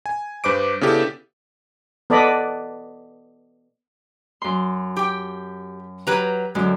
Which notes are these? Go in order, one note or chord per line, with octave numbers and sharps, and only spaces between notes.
G#5
G2 B4 C5 D6 D7
C#3 B3 D4 E4 G4 A4
B3 A4 D5 D#5 B5
F#2 C6
G4 G5
F#3 G4 B4 A#5
F#2 D3 G#3